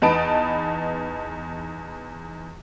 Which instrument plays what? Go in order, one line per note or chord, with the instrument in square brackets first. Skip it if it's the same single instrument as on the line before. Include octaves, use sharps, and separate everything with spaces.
[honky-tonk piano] E2 D#4 B4 A5 D7